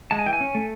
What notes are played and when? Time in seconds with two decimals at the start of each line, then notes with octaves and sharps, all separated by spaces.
0.11 G#3 A5
0.19 G#5
0.26 E3 G5
0.33 G#5
0.41 C#4
0.55 A3